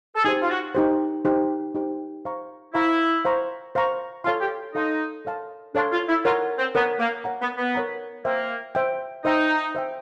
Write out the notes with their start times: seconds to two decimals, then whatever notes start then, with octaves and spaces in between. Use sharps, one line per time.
0.16 A4
0.24 D#4 G4 G#4 C5
0.42 F4
0.50 F#4
0.75 D#4 G4 C5
1.25 D#4 G4 C5
1.75 D#4 G4 C5
2.25 C5 F5 A#5 C#6
2.74 E4 C5 F5 A#5 C#6
3.25 C5 F5 A#5 C#6
3.75 C5 F5 A#5 C#6
4.24 F4 A4 C#5 F5 A5 C6
4.41 G4
4.74 D#4 A4 C#5 F5 A5 C6
5.25 A4 C#5 F5 A5 C6
5.75 D4 A4 C#5 F5 A5 C6
5.92 F4
6.09 E4
6.25 F4 A#4 C#5 F#5 A#5
6.59 C4
6.75 B3 A#4 C#5 F#5 A#5
6.99 A#3
7.24 A#4 C#5 F#5 A#5
7.42 B3
7.57 B3
7.75 A#4 C#5 F#5 A#5
8.25 A#3 C5 E5 G5
8.75 C5 E5 G5
9.25 D#4 C5 E5 G5
9.75 C5 E5 G5